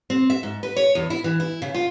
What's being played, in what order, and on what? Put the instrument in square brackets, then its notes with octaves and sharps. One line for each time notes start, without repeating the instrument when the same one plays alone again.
[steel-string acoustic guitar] C4
E5
G#2
B4
C#5
E2
E4
E3
E4
C#3
F4